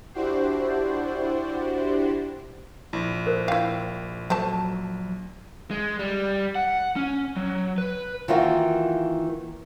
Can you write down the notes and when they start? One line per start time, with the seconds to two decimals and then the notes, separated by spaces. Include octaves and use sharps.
0.14 D4 E4 F#4 G4 C5
2.93 A#1 E4
3.26 A#4 C5
3.48 E4 F5 G5
4.30 F#3 A3 C4 A5
5.71 G#3
5.99 G3
6.55 F#5
6.96 C#4
7.36 F#3
7.78 B4
8.28 D#3 E3 A#3 F4 F#4